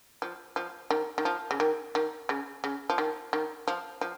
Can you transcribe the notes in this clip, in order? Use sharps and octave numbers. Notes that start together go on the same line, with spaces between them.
F3
F3
D#3
D#3
F3
C#3
D#3
D#3
C#3
C#3
F3
D#3
D#3
F3
F3